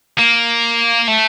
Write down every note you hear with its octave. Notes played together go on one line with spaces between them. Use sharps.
A#3
A3